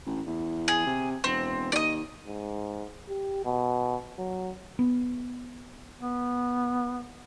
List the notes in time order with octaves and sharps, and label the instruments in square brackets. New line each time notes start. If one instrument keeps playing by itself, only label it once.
[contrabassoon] A1
E2
[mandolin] G#4
[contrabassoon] C3
[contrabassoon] E1 [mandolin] C4
[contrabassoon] D#2 [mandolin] D5 D#5
[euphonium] G#2
G4
B2
F#3
[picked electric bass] B3
[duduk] B3